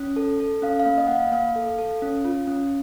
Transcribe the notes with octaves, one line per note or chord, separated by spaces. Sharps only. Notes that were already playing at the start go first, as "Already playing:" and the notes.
Already playing: C#4
A4
A4
C#4 F5
F5
A#3
D#5
A#3 F#5
F5
A#3 F5
A4
A4
C#4
F4
C#4